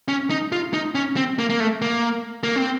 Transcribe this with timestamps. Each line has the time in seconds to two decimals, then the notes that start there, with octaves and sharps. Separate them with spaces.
0.08 C#4
0.30 D#4
0.52 F4
0.74 D#4
0.95 C#4
1.16 C4
1.39 A#3
1.50 A#3
1.60 A3
1.82 A#3
2.43 A#3
2.56 C4